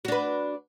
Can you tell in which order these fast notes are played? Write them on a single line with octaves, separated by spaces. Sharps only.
F#4 D4 B4